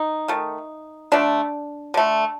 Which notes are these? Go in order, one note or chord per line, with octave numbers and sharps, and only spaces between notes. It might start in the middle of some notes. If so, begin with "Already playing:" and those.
Already playing: D#4
D#3 A3
D3 A3 D4
D3 A3